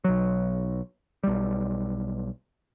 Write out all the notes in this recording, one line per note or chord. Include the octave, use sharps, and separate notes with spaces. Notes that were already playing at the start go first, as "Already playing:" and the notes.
B1 F#3
B1 G3